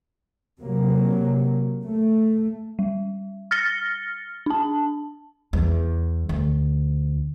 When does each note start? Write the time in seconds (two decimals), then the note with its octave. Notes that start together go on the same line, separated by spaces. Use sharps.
0.61 C3 F#3 A#3
1.85 A3
2.79 G3
3.51 F6 A6 A#6 C#7 G7
4.46 D4 A5
5.53 E2
6.29 D2